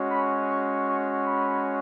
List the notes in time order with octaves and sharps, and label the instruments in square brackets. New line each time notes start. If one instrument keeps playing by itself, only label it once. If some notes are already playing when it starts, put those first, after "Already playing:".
Already playing: [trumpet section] G#3 C#4 F#4
B5
C#6
C#6
B5